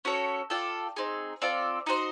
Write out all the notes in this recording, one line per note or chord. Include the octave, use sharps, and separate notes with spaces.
C#4 F#4 A4 C#5
F4 A4 D5 G5
C4 D#4 G#4
C4 F4 A4 D5
D#4 F#4 A4 C5